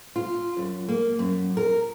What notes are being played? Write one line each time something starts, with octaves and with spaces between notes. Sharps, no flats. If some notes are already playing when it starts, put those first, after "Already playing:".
F4
F#2
A#3
F#2
A#4